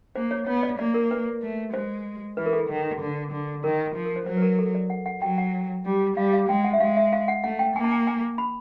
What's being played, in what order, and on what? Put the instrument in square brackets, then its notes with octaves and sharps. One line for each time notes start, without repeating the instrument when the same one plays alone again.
[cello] A#3 [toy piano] C5
[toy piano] C#5
[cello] B3 [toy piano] C#5
[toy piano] D5
[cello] A#3 [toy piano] D5
[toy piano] A#4
B4
[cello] A3
[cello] G#3 [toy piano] C5
[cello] E3 [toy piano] B4
[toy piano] A#4
A4
[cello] D#3
D3
D3
[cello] D#3 [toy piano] A#4
[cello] F3
[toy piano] A#4
C5
[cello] F#3 [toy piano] C5
[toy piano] B4
A#4
A4
D5
F#5
F#5
[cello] F#3 [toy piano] G5
[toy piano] F#5
[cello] G3
[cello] G3 [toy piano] F5
[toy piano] F5
[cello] G#3 [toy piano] G5
[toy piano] F#5
E5
[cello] G#3 [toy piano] F5
[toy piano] E5
F5
F#5
[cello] A3 [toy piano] F#5
[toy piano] G5
[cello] A#3 [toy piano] G#5
[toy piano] A5
G#5
G#5
B5